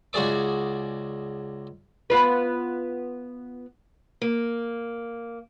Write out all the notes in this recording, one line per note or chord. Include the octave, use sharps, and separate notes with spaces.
C#2 F#4 G#4 D5 D6
B3 F4 B4
A#3